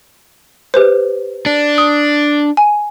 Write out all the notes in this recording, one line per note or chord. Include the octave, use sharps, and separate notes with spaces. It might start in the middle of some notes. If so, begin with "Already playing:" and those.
G4 B4 C5
D4
D#6
G#5